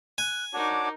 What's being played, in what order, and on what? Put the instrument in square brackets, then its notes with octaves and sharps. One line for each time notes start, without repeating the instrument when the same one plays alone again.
[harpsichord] G#5 [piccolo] F#6
[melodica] D4 F#4 C#5 [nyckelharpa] D#4 A#4 [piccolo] D6